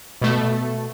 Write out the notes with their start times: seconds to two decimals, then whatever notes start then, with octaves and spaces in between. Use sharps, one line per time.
0.21 B2 A3